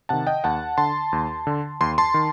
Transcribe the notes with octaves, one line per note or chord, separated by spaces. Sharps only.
C3 D#3 F#5 A5
D#5 G5
D#2 F#5 A5
D3 A5 C6
D#2
D3
D#2 C6
A5 C6
D#3